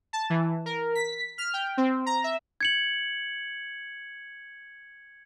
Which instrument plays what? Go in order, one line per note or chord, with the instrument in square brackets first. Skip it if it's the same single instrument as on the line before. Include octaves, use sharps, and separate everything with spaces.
[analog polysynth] A5
E3
A#4
B6
F6
G5
C4
A#5
E5
[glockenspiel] G#6 C#7 F#7